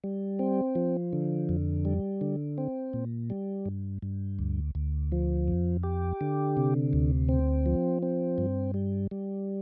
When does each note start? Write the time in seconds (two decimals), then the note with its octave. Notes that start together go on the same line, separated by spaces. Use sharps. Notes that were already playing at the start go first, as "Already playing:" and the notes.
0.04 G3
0.39 C4
0.75 F3
1.13 D3
1.49 F2
1.85 G3
2.21 D3
2.58 C4
2.93 A#2
3.30 G3
3.66 G2
4.02 G2
4.39 D2
4.75 D2
5.12 F3
5.48 F2
5.83 G4
6.21 D3
6.57 C3
6.93 D2
7.29 C4
7.66 F3
8.02 C4
8.38 G2
8.74 G3
9.11 G3